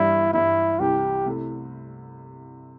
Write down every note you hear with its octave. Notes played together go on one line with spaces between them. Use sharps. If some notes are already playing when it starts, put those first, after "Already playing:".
Already playing: G2 E3 G3 E4
G2 E3 G3 E4
C2 C3 E3 G4
C3 A3 E4